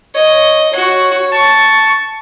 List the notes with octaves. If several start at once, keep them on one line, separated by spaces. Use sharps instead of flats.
C#5 D#5
F#4 C#5
A5 C#6